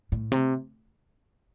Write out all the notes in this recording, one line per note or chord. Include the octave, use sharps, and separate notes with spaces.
A2
C3